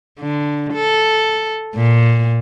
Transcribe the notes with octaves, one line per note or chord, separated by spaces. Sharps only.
D3
A4
A#2